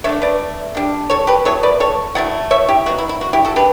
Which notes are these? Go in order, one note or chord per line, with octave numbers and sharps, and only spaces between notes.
D3 A3 D4 C#5 E5
B4 D5
D3 G3 D4
A4 C#5
G4 B4
F#3 B3 E4 A4 C#5
B4 D5
A4 C#5
F#3 A3 E4 D5 F#5
C#5 E5
E4 G4
B2 F#3 B3 F#4
E4
E4
F#4
E4 G4
F#4 A4
D4 G4 B4